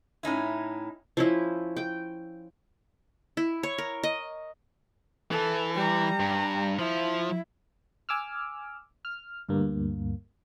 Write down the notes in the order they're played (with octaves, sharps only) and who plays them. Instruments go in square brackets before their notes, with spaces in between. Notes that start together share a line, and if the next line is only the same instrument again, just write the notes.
[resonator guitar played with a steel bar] A2 C#4 D#4 E4
[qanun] F3 C#4 E4
G5
E4
C#5
A#4
D#5
[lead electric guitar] E3 [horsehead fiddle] A4
[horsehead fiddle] G3 A#5
[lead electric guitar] G2
[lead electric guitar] F3 [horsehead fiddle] E4
[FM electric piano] G#5 D6 E6 F6
F6
D2 G2 A#3